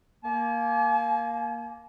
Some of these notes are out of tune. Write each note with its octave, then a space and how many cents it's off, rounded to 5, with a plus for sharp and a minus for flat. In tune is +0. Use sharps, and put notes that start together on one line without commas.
A#3 +0 G#5 +45